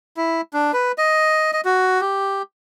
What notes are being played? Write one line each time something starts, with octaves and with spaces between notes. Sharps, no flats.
E4
D4
B4
D#5
D#5
F#4
G4